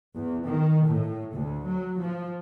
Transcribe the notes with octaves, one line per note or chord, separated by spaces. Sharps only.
E2
D#3
A2
D2
F#3
F3